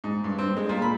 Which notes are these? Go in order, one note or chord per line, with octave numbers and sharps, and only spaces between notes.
G#2
G2
C4
G#3
A#2
B5